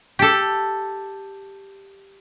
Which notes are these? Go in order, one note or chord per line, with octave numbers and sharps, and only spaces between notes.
G4 A4